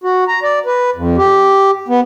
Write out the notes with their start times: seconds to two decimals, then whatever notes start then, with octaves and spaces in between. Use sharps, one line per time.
0.04 F#4
0.28 A#5
0.43 D5
0.66 B4
0.96 F2
1.17 G4
1.88 B3